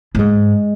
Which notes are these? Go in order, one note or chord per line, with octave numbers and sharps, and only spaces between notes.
A2
G#2 G#3